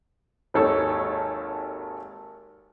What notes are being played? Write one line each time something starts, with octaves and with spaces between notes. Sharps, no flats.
G#1 D#2 A4 C#5